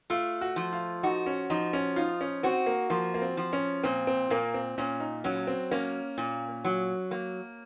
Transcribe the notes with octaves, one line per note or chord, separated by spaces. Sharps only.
A3 F4
F#4
F3
F4
D#4 F#4
C#4
F3 D#4
C#4
D#4 F4
C#4
C4 F#4
A#3
F3 A#3
A#3
C4
F3
C#4
A#2 C4
C4
A#2 A#3
C4
A#2 C#4
D#4
F#3 C#4
C4
A#3 C#4
A#2
F#3
A#3